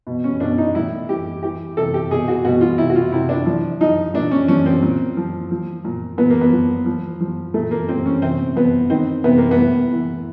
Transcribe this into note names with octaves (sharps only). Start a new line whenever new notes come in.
B2
C#4
B2 D4
D#4
A2 E4
E3 G4
E3 G4
C3 A4
G4
B2 G#4
F#4
B2 F#4
F4
C3 E4
F#4
F4
C3 E4
D4
F3
F3 D#4
A#2 D4
C#4
F3 C#4
C4
A#2
F3
F3
A#2
A#2 B3
A#3
B3
F3
F3
F3
A#2 A3
A#3
A#2 C4
C#4
C3 C4
F3 B3
D#3 C4
C3 B3
A#3
B3
A2
E3